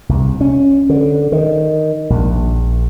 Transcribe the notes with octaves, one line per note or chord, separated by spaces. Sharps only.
C2
C#4
D3
D#3
A#1